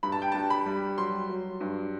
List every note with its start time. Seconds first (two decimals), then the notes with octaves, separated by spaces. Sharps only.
0.03 G2 B5
0.12 A5
0.22 G5
0.32 G2 A5
0.50 B5
0.66 G3
0.98 F#3 C6
1.29 F#3
1.61 G2